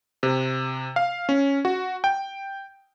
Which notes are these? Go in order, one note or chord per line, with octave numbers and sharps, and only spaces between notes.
C3
F5
C#4
F#4
G5